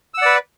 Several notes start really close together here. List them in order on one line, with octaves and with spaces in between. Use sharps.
E6 F#5 D5 B4